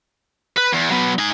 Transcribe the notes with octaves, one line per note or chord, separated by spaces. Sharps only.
B4
E2
F#3 B3
D#4 G#5